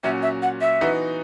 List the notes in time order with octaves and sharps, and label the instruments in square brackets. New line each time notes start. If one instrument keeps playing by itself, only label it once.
[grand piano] A#2 F#3 C#4 F#4 [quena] E5
[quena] E5
F#5
E5
[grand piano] E3 B3 D#4 F#4